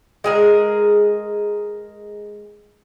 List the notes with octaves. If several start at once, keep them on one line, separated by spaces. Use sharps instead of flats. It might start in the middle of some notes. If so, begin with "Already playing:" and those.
G#3 G#4 A#4